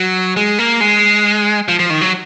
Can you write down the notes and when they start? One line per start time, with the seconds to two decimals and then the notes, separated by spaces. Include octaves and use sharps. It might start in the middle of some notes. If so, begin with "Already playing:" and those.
Already playing: F#3
0.37 G#3
0.59 A#3
0.80 G#3
1.68 F3
1.79 F3
1.90 D#3
2.01 F#3